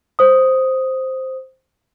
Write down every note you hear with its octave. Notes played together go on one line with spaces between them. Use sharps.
C5 D#6